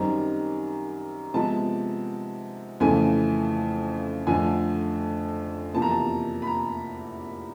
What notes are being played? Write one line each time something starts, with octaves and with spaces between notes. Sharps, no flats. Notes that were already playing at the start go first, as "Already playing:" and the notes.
Already playing: F#2 D#3 G3 C4 A#5
C3 F3 G#3 B3 A5
F2 C#3 E3 A3 G#5
F2 D3 F3 A3 G#5
E2 C3 F3 A#3 A5
A#5
A5
B5
A#5